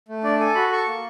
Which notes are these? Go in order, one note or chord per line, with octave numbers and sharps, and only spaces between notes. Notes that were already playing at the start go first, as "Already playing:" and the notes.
A3
D4 D5
A4 G#5
F#4 B5
A4 C#6
A#3